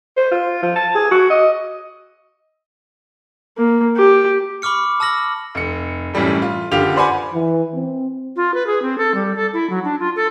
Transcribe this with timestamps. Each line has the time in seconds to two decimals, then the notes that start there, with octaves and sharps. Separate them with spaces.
0.17 C5
0.32 F4
0.62 F3
0.76 A5
0.95 G#4
1.11 F#4
1.30 D#5
3.57 A#3
3.96 G4
4.62 B5 C#6 D6 F6 C#7
5.00 A5 E6 F6 A#6 F#7
5.55 F1 C#7
6.14 F#2 A2 E3 G3 A3
6.42 F4
6.72 F#1 D3 F4 G4 F7
6.96 B4 C5 D5 F#5 G#5 B5
7.34 E3
7.74 C4
8.36 F4
8.54 B4
8.67 G#4
8.82 C4
8.98 A4
9.15 G3
9.36 A4
9.53 E4
9.70 F#3
9.84 D4
10.00 F4
10.16 A4